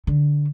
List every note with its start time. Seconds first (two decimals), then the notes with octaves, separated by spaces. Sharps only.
0.07 D3